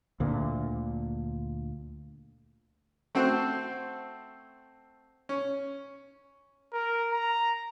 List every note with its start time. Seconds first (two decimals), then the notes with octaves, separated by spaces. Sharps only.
0.20 D2 A#2 D3
3.15 A3 C4 F#4 C5
5.29 C#4
6.73 A#4
7.12 A#5